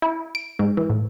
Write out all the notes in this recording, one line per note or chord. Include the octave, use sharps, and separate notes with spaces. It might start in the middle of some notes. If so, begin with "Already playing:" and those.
E4
D7
G#2
E3
A2